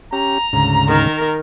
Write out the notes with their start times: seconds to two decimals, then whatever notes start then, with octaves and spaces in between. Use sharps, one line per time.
0.13 C#4 G4 A#5
0.53 D2 G#2 C#3
0.88 D#3 A#4